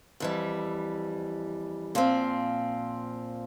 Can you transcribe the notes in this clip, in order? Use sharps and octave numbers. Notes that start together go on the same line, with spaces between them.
F2 E3 G3
A#2 F3 C4